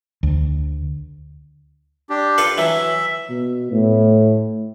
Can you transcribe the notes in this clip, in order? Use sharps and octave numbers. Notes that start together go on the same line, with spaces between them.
D2
D4 G4
F4 A4 B4
E3 F#3 E5
B2
A2